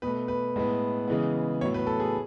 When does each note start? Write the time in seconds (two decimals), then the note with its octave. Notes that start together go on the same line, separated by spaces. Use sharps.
0.02 B2 A3 B4
0.28 B4
0.56 A2 G#3 B3
1.08 C#3 E3 G#3 B3
1.61 A2 F#3 B3 C#5
1.74 B4
1.87 A4
2.00 G#4